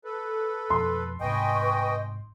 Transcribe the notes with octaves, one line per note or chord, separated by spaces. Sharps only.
A4 B4
F2 B2 C6
G1 G#2 C3 B4 D#5 G5 G#5 C#6